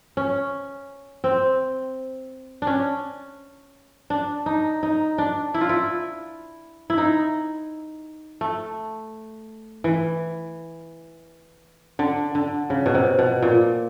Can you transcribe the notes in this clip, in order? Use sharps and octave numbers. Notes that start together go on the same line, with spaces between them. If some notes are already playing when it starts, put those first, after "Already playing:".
C#4
C4
D4
C#4
D4
D#4
D#4
D4
E4
F4
E4
E4
D#4
A3
E3
D3
D3
C#3
B2
C3
B2
A#2